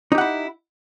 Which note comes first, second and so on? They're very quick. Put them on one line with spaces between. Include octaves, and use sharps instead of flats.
D#4 G4 F#5 E4